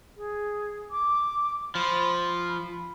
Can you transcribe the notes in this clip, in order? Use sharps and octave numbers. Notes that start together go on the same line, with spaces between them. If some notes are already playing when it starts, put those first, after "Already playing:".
G#4
D6
F3 B5
B5